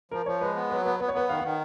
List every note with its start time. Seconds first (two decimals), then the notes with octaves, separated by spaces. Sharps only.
0.11 F3 A#4
0.26 F3 C#5
0.41 G#3 B4
0.56 B3
0.70 F#3 B4
0.85 B3 B4
1.00 B3 B4
1.08 C#5
1.14 B3 B4
1.29 D#3 F5
1.40 D#3 F#5